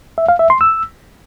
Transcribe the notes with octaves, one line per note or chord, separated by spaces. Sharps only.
E5
F5
E5
C6
E6